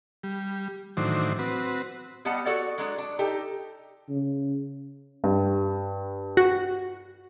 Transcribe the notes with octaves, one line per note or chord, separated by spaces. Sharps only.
G3
A2 D#3 E3 F#3 D4 C5
C4 F#4 B4
G3 B3 D#5 F#5 A5
F#4 A4 C#5 D5
F#3 G#3 D4
D4
D#4 G4 A4
C#3
G2
F#4